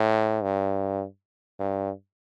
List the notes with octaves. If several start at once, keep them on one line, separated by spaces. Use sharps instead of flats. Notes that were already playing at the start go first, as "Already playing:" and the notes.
Already playing: A2
G2
G2